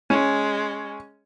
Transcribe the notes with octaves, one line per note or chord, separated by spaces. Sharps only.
G#3 C#4